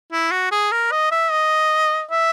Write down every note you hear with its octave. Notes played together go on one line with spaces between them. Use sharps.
E4
F#4
G#4
A#4
D#5
E5
D#5
E5